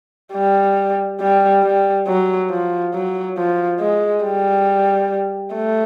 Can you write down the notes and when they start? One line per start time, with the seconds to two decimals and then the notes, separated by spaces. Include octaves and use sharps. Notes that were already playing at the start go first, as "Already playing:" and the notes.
0.33 G3
1.21 G3
1.63 G3
2.07 F#3
2.50 F3
2.94 F#3
3.37 F3
3.80 G#3
4.24 G3
5.54 A3